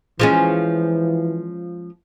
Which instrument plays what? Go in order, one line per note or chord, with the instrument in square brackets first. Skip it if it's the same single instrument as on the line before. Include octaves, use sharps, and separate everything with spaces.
[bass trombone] E3 [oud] F3 G#3 C#4